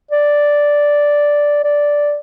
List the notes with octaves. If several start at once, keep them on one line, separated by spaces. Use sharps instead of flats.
D5
D5